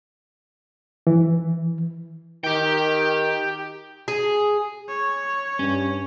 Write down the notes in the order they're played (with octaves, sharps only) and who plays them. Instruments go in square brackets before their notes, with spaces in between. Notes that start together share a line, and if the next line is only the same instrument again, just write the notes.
[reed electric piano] E3
[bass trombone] D#3 [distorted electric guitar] G4 G5
[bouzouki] G#4
[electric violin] C#5
[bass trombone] G2 [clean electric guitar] C#4